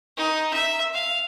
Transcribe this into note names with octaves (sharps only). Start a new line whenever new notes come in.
D#4
E5
F5